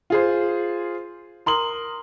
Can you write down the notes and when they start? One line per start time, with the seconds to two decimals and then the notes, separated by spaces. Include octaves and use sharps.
0.10 F4 G#4 C5
1.46 A#4 C6 D#6 F#7